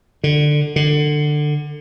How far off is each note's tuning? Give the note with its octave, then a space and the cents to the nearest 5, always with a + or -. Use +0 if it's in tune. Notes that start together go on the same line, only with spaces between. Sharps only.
D3 +15
D3 +20